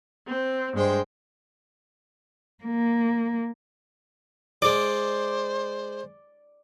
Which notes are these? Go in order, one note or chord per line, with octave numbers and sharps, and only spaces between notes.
C4
G2 G#3 C5 G5
A#3
G#3 C5 D5 D6